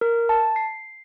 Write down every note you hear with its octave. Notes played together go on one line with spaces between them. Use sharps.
A#4
A5
C7